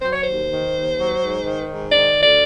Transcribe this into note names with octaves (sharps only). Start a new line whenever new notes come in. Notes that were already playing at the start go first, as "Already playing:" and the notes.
F#3 C5
C#5
D#2 C5
D#3
D#2
F#3
G#2
D#3
G#2
D#3 D5
D2
D5